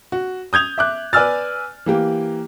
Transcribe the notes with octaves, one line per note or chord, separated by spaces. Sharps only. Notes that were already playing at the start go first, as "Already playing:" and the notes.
F#4
D#6 G6 G#6 F7
E5 D6 F#6
B4 D5 G#5 E6 F6 A6
E3 A#3 G4